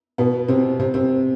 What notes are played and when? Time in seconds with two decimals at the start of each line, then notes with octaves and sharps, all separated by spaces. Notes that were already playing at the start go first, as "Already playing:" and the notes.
0.18 B2 B3
0.48 C3 C4
0.79 C3 C4
0.94 C3 C4